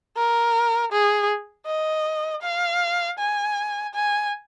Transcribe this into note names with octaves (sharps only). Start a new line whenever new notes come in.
A#4
G#4
D#5
F5
G#5
G#5